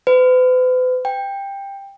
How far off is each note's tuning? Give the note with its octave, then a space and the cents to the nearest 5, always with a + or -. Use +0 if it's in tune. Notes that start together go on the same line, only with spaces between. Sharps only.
B4 +45
G5 +15